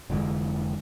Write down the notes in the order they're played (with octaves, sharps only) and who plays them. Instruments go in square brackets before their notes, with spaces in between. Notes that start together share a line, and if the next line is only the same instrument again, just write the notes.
[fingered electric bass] F1 D3 E3 G#3